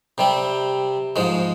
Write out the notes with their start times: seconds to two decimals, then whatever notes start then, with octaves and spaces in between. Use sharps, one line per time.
0.18 C3 G3 C4
1.16 G#2 F3 G#3